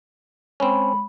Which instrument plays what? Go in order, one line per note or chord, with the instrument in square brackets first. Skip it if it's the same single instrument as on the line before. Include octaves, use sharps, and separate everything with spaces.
[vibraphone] G#3 B5 [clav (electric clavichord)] C4 C#4